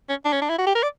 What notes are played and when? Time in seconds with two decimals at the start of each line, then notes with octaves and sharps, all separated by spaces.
0.09 C#4
0.25 D4
0.33 C#4
0.42 D4
0.49 E4
0.58 F#4
0.67 G4
0.75 A#4
0.83 D5